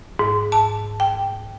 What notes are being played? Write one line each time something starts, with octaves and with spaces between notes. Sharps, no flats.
G#2
A5
G5